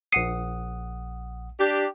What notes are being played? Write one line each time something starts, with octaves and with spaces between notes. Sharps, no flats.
A#1 F#5 D#6 C7 C#7 D#7
D4 G4